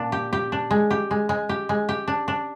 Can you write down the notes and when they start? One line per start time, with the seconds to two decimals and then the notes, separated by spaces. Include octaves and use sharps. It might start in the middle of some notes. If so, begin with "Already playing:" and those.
Already playing: A#2 D4
0.12 G4
0.33 G4
0.52 D4
0.71 G#3
0.91 G4
1.11 G#3
1.29 G#3
1.49 G4
1.69 G#3
1.89 G4
2.08 D4
2.28 D4